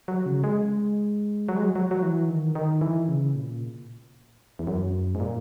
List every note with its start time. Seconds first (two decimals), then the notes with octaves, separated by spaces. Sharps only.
0.08 F#3
0.26 C#3
0.44 G#3
1.49 F#3
1.56 G#3
1.64 F#3
1.76 F#3
1.91 F#3
2.03 E3
2.29 D#3
2.55 D#3
2.81 E3
3.08 C#3
3.35 A#2
4.59 E2
4.67 F#2
5.15 G#2
5.20 A#2